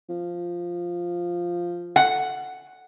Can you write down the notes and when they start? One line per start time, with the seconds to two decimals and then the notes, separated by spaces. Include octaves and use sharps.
0.09 F3
1.96 F#5